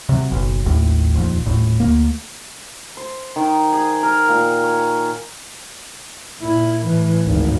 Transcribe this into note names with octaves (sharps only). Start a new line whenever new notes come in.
C3 F#3
F#1 B1
D#1 G#1 D#2 A2
D#1 A#1 F2
D#1 A2
D2 A#3
C5
D#3
G#4
A#4
A#2
C#5
A#2 E4
A2 E3
G#1 D2